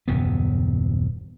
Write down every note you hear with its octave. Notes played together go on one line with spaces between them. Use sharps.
D#1 F#2 C#3 B3